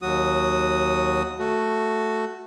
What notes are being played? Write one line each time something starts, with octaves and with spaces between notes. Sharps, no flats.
D#2 F#3 F#4 D#6
A3 F#4